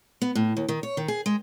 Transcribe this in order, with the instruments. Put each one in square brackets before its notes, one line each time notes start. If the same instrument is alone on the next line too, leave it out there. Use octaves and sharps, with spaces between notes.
[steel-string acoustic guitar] B3
A2
D#2
D#3
C#5
D#3
G#4
G#3